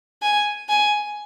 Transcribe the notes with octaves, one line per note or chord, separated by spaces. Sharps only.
G#5
G#5